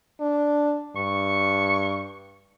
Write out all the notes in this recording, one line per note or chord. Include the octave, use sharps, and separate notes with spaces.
D4
G2 C#6